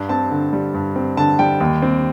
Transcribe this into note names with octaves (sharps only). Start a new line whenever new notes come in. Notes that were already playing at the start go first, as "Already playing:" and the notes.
Already playing: G2
C4 A5
D3
G3
G2
C4
D3 A5
G3 G5
D#2
C4